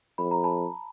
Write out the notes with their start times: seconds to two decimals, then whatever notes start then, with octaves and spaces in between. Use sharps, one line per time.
0.18 F2 B5
0.31 A#5
0.44 A5 B5